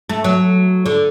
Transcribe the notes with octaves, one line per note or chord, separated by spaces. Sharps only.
A3
F#3
D3